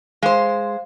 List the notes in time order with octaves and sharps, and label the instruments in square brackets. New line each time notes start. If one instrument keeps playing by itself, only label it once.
[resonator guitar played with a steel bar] G#3 C5 [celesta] F5